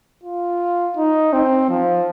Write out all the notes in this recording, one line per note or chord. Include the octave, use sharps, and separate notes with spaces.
F4
D#4
C4
F3